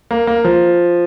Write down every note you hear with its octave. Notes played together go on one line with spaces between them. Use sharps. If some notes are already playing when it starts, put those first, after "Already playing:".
A#3
A#3
F3